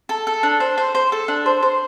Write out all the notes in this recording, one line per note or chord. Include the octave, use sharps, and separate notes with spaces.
A4
A4
D4
C5
C5
C5
A4
D4
C5
C5